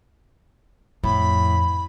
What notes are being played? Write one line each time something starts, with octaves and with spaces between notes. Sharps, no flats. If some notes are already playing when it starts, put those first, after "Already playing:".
F2 A2 B5